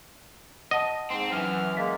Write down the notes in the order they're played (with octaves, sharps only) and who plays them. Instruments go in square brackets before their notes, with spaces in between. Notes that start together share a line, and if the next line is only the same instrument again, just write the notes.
[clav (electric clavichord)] D#5 [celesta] F#5 A5
[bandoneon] G#2 C6 [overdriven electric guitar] C4
[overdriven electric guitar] F#2 [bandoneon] E3 F6
[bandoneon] G#3 A#3 [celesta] F5 A6 B6